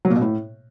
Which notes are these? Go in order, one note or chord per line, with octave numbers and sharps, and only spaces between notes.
F#3
A#2
B2
A2